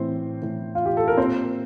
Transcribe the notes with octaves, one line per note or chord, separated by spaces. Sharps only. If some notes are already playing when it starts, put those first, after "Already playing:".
Already playing: A2 E3 C4 C5
A2 E3
F4
G4
A4
A#4
A#2 C4 C5